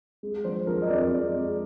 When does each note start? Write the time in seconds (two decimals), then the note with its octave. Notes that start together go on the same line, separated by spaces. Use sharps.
0.23 G#3
0.44 F3 C5
0.67 F3 A#4
0.82 D#5
0.90 F2 D5
1.12 F2 D5
1.34 G#3